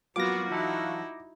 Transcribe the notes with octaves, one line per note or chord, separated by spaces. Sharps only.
F2 F#3 A#3 B3 F4 F#4 D6 A#6
E3 F#3 D#4 E4 A4